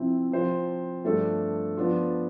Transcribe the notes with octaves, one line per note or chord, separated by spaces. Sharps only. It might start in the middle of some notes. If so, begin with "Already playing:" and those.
Already playing: C3 F3 C4 E4
F3 C4 F4 C5
G2 F3 A3 D4 A4
F3 B3 D4 F4